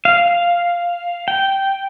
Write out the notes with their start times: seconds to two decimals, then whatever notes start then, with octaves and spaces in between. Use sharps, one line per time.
0.05 F5
1.28 G5